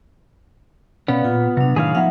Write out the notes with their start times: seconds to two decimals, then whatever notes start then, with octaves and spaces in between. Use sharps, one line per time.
1.08 B2 B3 C#4 C#5 D5 F5 B5
1.24 A#2 F4
1.57 C3 F#3 G3 D4
1.76 A2 D#3 E4 G#4 C#5 F5
1.95 F3 B3 D#4 E5 F#5